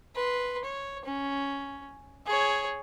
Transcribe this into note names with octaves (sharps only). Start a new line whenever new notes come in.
B4 C6
C#5
C#4
G#4 C#5